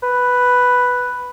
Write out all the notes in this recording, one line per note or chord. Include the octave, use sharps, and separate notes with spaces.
B4